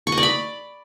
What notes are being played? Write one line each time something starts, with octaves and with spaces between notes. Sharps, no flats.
C#6
D#5
D5
B5